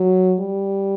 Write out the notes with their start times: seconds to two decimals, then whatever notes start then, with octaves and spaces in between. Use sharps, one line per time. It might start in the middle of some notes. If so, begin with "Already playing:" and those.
Already playing: F#3
0.40 G3